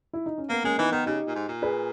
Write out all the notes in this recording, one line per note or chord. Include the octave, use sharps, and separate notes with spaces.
E4
D#4
C#4
A#3 B3
G#3 A#3 C#4
E3 B3 D#4
D#3 B3 D#4
C#3 D#4 G4
A#2
G#2
A#2
G#4 B4